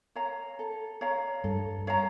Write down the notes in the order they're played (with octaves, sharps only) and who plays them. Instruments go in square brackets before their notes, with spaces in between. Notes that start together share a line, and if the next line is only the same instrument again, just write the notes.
[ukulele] C#5 F5 A#5
A4
C#5 F5 A#5
[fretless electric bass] G2 [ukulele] A4
[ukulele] C#5 F5 A#5